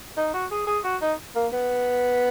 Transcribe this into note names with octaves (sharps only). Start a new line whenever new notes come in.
D#4
F#4
G#4
G#4
F#4
D#4
A#3
B3